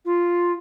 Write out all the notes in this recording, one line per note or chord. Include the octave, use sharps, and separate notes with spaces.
F4